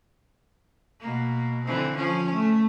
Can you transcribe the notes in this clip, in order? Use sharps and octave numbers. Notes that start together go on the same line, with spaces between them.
B2 A#3
D3 E3 C4
F3 C#4
A3